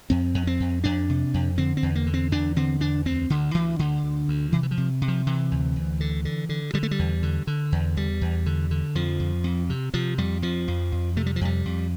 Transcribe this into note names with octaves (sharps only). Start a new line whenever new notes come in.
F2 C4
F2
C4
F2
F2 D4
C3
F2
D3 C4
C4
E2
A#3
D3
C4
E2 D4
D3 C4
E2 D4
D2 C4
D2 D3
D2 E3
D2 D3
D2
D2
C3 E3
E3
F3
C3
C3
F3
C3 E3
D2
D2
D3
D3
D3
D3 G3
A3
G3
E2
D3
D3
E2
E2 G3
E2
D3
D3
F2 F3
F2
F2
C3
C3 F3
F2 G3
F2 F3
F2
F2
C3 A3
G3
F3
F2 G3
F2